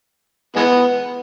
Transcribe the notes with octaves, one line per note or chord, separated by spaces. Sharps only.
E3 G#3 B3